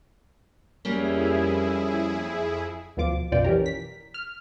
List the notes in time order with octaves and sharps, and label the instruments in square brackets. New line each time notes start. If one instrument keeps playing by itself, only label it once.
[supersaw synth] F2 E4 G#4 [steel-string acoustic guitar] G3 A#3 C#4
[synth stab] D2 B2 F3 F4 D6
B1 F#2 B2 F4 D5 G5
E3 C#4 G4 A#4
B6
F6